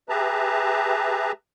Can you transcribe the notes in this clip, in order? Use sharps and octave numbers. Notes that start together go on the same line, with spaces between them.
G4 G#4 B4 E5 A5 A#5